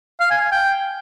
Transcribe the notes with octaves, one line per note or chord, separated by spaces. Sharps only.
F5
G#5
G#5
G5